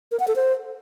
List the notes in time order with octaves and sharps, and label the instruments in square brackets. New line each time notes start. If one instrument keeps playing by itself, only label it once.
[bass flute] A#4
F#5
A4
C5